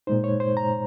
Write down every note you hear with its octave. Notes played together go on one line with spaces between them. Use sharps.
A#2 G#3 D#4 C5
C#5
C5
A#5